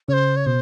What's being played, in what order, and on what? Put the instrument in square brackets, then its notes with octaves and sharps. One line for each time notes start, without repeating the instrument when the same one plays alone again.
[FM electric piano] C#3 [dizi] C5 C#5
[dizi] C#5
[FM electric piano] B2 [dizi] C5